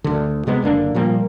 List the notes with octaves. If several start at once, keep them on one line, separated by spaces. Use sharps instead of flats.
D2 D3
C3 G#3 B3
F#1 D3 A#3 D4
A#2 F3 G3 A#3